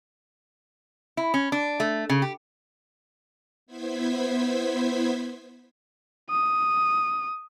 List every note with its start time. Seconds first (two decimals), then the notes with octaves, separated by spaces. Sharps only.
1.17 E4
1.34 C#4
1.52 D4
1.80 A3
2.09 C#3
2.22 G4
3.66 B3 E4 C5 G#6 B6
6.30 D#6